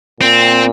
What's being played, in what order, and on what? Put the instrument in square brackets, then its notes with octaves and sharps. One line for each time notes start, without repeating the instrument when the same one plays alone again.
[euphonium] A#2 [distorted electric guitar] C4